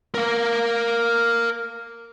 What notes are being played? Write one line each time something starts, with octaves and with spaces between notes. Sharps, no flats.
A#4 F5